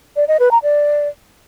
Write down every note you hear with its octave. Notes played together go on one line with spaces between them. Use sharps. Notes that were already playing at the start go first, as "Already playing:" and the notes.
D5
D#5
B4
A#5
D5